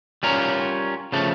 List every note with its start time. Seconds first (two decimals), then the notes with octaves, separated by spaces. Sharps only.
0.23 G3 C#4 F4 A#4
1.12 C#3 F3 A3